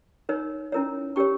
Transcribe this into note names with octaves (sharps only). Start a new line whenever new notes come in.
D#4 A#4 C#5
C#4 E4 A#4 C#5
C#4 G4 A#4 C#5 C#6